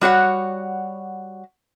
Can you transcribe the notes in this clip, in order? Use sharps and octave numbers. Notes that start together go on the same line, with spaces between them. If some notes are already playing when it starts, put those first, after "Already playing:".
G3 F#4 C#5 F#5